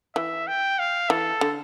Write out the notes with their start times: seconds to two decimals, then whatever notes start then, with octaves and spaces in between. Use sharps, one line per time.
0.15 E3 E5
0.47 G5
0.79 F5
1.10 E3 A4
1.41 D3